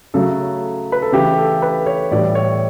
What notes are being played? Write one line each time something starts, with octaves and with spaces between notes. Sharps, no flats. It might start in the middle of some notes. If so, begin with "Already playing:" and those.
C#3 F#3 A3 A4
B4
A4
C#3 E3 A3 G4
A4
B4
C#5
A2 E3 G3 D5
C#5